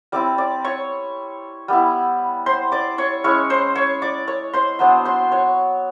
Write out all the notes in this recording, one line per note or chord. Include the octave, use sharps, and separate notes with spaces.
G3 C4 E4 D5 D6
D5 D6
C#5 C#6
G3 B3 E4
C5 C6
D5 D6
C#5 C#6
G#3 C#4 E4 C#5 C#6
C5 C6
C#5 C#6
D5 D6
C#5 C#6
C5 C6
F#3 B3 D4 C5 C6
C5 C6
C#5 C#6